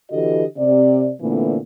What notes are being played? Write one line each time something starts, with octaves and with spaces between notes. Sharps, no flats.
D3 E3 F#4 G4 A4 D#5
C3 D5
A#2 D3 E3 A3 B3 C4